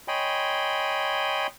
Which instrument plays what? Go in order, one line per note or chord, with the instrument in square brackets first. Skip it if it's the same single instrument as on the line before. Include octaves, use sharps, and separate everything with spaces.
[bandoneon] C#5 D#5 G5 G#5 B5 C6